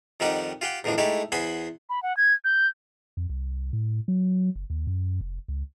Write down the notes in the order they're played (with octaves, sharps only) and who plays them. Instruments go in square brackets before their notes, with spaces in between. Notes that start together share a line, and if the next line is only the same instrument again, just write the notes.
[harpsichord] F2 D#3 G3 D#4 G4 F#5
F4 G4 F#5 G5
E2 A2 D#3 F3 D4
G#3 A3 D#4 E4 G4 A4
E2 C5 F#5 G#5 B5 D#6
[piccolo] B5
F#5
G#6
G6
[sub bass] F2
C2
A2
F#3
F#1
D#2
F#2
F1
C#2